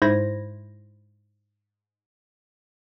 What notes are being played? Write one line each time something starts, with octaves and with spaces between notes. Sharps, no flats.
G#2 E4 C5 B5 G#6 A#6